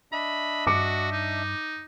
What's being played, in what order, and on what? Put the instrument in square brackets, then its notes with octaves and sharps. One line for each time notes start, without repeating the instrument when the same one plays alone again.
[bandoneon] D4 D#5 E5 [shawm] B5
[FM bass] G2 [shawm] F#4 [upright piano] D6 C#7
[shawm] D#4